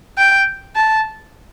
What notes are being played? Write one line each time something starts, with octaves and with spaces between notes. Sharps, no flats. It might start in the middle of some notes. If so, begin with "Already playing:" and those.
G5
A5